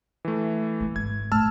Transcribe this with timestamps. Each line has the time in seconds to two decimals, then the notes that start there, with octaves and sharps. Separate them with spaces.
0.25 E3 A3
0.80 A#3 C4
0.96 G#1 G#6
1.32 A2 G3 A5 E6 F6